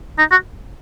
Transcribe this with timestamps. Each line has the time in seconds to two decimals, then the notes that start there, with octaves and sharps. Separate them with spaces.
0.18 D#4
0.31 F#4